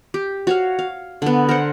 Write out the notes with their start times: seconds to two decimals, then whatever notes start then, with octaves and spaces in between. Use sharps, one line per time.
0.14 G4
0.47 F#4 C#5 F5
0.79 F5
1.22 D3 B3
1.49 A#4 C5 F#5